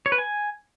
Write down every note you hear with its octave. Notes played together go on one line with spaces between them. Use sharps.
C#5
B4
G#5